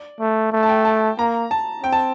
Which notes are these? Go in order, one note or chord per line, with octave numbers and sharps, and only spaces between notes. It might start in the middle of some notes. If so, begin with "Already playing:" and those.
Already playing: D5
A3
A3
A5
G5
A5
A#3 A#5
A5
C4 G5
A5